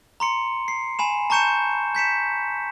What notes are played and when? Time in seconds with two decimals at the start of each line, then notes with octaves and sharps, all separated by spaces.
0.20 A#5 C6 C#7
0.68 C7
0.99 G#5 B5 E7
1.30 A5 A#5 C#6 G6 C#7 E7
1.95 G6 B6 C#7 E7